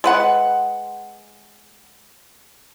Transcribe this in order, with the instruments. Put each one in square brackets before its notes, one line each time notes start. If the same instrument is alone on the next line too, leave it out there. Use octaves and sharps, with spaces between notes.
[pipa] G#3 B4 F#5